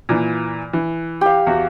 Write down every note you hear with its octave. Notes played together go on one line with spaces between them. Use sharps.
A#2 E3
E3
G4 F5
E2 F#4